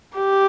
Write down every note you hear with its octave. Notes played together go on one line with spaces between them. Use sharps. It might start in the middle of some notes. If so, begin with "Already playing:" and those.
G4